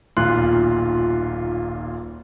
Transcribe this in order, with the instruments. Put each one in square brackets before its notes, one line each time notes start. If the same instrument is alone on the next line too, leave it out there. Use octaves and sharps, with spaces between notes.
[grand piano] D#1 B1 A#2 F4 C6 F#6